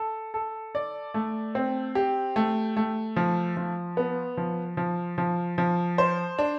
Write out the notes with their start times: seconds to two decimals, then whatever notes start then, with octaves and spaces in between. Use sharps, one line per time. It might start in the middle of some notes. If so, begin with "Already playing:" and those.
Already playing: A4
0.34 A4
0.75 D5
1.14 A3
1.55 C4
1.95 G4
2.36 A3
2.77 A3
3.16 F3
3.57 F3
3.97 B3
4.37 F3
4.77 F3
5.18 F3
5.58 F3
5.98 C5
6.39 D4